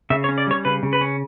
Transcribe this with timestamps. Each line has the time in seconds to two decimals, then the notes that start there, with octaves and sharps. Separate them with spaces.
0.10 C#3 E5
0.24 C#5
0.29 C#4
0.38 D5
0.47 G3 C#5
0.65 C#3 B4
0.83 C#3
0.93 B4
1.01 C#4